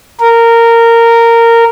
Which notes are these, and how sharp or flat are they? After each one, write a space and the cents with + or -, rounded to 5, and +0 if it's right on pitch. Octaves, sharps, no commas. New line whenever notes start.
A#4 -15